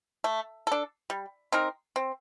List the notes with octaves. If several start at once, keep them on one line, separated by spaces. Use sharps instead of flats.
A3
D4 A4
G3
C4 D#4 A#4
C4